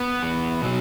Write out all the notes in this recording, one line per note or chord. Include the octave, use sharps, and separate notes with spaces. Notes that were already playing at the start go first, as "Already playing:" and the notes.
Already playing: B3
E2
B2 F#3